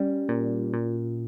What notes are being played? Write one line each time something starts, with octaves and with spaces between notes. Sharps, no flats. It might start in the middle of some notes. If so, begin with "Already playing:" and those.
Already playing: G3 C#4
A#2
A#2